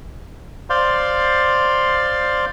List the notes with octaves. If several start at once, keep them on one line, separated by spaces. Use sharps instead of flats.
C5 D5 F5 C6